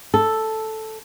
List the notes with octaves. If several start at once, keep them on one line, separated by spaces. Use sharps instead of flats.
A4